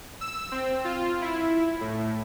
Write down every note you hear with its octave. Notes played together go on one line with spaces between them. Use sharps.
E6
C4
F4
E4
A2